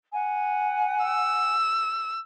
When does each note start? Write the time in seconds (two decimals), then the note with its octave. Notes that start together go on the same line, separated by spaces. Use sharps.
0.13 F#5 G#5
1.04 E6